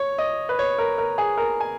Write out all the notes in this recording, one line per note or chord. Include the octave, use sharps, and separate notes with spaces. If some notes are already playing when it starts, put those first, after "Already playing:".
Already playing: C#5
D#5
B4
C#5
A#4
A#4
G#4
A#4
G#5